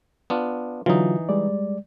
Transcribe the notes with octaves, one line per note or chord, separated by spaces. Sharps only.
B3 D4 F4
D3 E3 F#3 D#4 F4
G3 G#3 D5